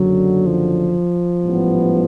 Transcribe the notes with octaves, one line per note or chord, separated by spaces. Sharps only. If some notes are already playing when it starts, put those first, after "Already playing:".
Already playing: F#1 F#2 D3 F#3
F3
A1 G#2 E3 G3 B3